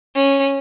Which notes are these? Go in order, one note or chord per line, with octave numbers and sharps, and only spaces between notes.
C#4